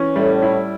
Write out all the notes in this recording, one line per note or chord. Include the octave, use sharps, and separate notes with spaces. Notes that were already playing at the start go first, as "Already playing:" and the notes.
Already playing: E3 C#4
A2 G3
E4